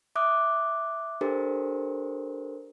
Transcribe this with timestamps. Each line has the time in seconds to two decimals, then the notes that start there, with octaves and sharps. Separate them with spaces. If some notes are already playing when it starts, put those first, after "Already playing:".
0.16 E5 D6 D#6 F#6
1.21 D4 G4 A4 A#4 C5